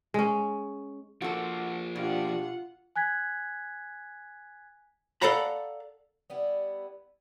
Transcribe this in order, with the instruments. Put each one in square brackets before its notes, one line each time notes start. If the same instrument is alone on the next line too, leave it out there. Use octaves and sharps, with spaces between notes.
[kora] G#3 C#4
[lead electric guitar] F3 A#3 [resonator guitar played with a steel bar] F#4 A4
[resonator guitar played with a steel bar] B2 [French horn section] D4 G4 [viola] F4 F#5
[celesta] G#5 F#6 G#6 B6
[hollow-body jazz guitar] A4 D5 F5 F#5 A#5 B5
[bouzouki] G3 B3 E4